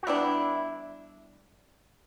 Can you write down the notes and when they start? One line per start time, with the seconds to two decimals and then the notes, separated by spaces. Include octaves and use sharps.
0.03 F#4
0.07 G3 B3 D4 E4